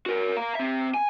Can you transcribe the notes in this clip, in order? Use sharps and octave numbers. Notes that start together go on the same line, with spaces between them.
F#4 A#4
F5 A#5
C4 E5
G#5